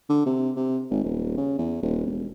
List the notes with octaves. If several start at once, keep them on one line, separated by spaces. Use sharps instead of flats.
D3
C3
C3
G#1
D#1
C#3
E2
D#1
E1